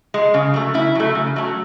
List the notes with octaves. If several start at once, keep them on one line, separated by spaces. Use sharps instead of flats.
G#3
C#3
F#3 A3
C#3 E4
F#3 A3
C#3
F#3 A3